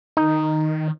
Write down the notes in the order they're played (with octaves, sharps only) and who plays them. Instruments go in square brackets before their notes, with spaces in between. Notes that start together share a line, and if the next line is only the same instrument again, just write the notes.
[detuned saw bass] D#3 [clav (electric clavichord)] D#4